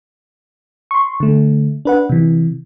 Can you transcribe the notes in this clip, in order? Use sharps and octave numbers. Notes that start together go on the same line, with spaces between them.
C6 C#6
D3 A3
D4 B4 F#5
C3 E3